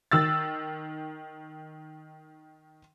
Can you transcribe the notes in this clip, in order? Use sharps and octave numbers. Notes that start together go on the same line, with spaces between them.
D#3 E6 A6